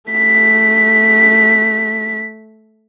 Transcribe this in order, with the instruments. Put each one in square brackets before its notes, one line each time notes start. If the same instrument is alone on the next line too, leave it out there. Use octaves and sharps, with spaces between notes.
[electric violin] A3 B6